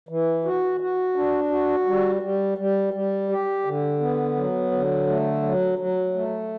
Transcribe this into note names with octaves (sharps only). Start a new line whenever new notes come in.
E3
F#4
F#4
D4
F#4
G3
G3
G3
G3
G4
D3
B3
F#3
D3
A3
F#3
F#3
A3